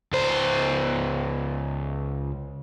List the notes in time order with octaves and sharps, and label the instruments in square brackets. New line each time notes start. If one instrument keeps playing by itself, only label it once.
[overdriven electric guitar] C#2 C5